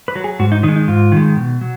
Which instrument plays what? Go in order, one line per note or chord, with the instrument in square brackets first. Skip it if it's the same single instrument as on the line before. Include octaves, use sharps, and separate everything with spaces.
[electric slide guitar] B4
F#3
G#4
G#2 F#4
D#4
D#3 D#4
G#3
D#4
G#2 F4
D#3 G#3
B2
F#3